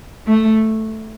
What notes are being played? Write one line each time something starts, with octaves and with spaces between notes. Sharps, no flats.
A3